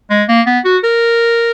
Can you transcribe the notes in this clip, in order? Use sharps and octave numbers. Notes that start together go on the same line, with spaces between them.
G#3
A#3
B3
F#4
A#4